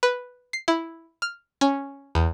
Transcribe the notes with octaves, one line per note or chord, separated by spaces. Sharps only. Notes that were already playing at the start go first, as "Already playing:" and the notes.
B4
C7
E4
F6
C#4
E2